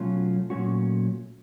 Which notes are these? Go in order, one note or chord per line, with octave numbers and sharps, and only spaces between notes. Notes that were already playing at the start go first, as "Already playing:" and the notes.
Already playing: B2 F#3 A3 C#4 F4
A#2 F#3 A3 C#4 F#4